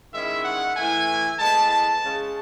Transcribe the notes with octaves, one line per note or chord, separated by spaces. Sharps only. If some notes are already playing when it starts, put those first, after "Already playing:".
D#3 G#3 C#4 E4 E5
F#5
A2 E3 A3 E4 G#5
A2 G#3 B3 E4 A5
A5
C#3 G#3 C#4